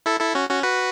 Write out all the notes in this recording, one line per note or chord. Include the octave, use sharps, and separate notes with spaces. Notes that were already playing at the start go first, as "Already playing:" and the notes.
E4 A4
E4 A4
C#4 F#4
C#4 F#4
F#4 B4